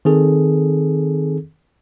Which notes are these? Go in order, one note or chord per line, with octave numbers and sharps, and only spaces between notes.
D#3 C4 G#4 A4